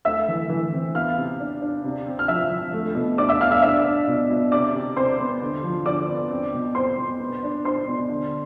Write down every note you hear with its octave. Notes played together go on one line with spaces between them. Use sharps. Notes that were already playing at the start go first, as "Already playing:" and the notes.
A3 E5 E6
E3
E3
C4
B3 F5 F6
C3
D4
D4
C3
C4
F6
F3 E5 E6
F3
A3
B2
D4 D5 D6
E5 E6
B2 F5 F6
E5 E6
D4 E5 E6
D4
B2
B2
C3 D5 D6
C3
C3 C5 C6
B3
D3
F3
D3 D5 D6
B3
C4
B2
C4 C5 C6
B2
B3
D4
D4 C5 C6
B2
D3